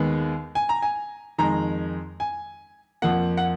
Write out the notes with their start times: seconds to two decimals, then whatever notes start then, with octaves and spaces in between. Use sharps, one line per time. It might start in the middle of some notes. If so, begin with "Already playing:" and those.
Already playing: D#2 D#3 G#3 B3
0.55 G#5
0.69 A#5
0.82 G#5
1.38 F2 D#3 G#3 A#5
2.20 G#5
3.02 F2 F3 A#3 F#5
3.37 F#5